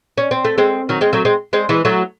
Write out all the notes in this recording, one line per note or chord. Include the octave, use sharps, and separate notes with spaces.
C#4
C4
A3
G#3 C4
D#3 F#3
G#3 C4
F#3 A3
G#3 C4
G#3 C4
E3 G#3
F#3 A3